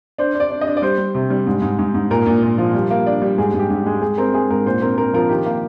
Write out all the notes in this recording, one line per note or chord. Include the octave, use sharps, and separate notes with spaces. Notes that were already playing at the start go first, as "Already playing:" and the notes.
D4 C5
D4
D5
D4
D#5
D4
D5
G3 C5
G3
C3
G3
G#2
G#2
G#2
G#2
A#2 A#4
A#2
A#2
F3
G3
A#3
D4
G3
G#2 G#4
G#2 G4
G#2
G#3
G4
G#3 G#4
C4 A#4
G#3 G#4
G#2 A#4
A#2 C5
C4 A#4
A#2 A#4
F3 A#4
D#3 G4
A#3